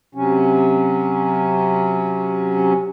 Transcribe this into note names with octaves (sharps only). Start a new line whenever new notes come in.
C3 F#3 C#4